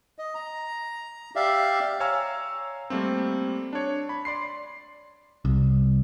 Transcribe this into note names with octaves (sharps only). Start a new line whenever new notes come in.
D#5
A#5
G4 D5 E5 F5
C#5 F5 G#5 A#5 E6 F6
G3 A3 A#3 C4
D4 C#5
B5
D5 C6 C7
C2